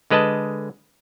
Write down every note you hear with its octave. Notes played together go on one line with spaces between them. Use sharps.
D3 G#3 B4 D#5 A5